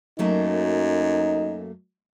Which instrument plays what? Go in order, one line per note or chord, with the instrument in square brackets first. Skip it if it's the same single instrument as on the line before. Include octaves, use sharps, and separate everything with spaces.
[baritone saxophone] F#2 [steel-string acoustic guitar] F#3 A3 A#3 [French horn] D#4